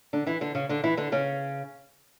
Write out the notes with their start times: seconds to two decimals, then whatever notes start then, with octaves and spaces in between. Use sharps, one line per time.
0.13 D3 D4
0.26 E3 E4
0.41 D3 D4
0.55 C#3 C#4
0.69 D3 D4
0.84 E3 E4
0.97 D3 D4
1.12 C#3 C#4